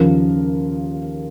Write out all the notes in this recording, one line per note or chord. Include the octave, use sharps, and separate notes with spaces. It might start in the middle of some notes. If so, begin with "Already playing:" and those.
Already playing: D#2 C#3 F3 A#4